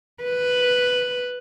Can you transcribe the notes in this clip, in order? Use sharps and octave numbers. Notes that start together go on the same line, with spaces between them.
B4